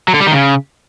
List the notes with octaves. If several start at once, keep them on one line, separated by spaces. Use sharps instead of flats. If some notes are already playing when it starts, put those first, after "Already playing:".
F#3
D3
G3
D#3
C#3